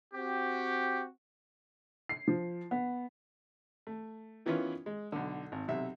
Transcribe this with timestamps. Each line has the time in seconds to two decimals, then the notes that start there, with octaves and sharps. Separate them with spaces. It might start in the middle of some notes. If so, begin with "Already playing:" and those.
0.14 C4 F#4 G4
2.09 C7
2.28 F3
2.71 B3
3.87 A3
4.46 D#3 E3 B3 C#4 E4 F4
4.86 G#3
5.12 B1 D3
5.52 G#1
5.68 B1 C3 E5